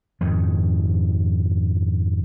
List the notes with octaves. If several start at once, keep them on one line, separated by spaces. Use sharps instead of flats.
F2 G#2 D#3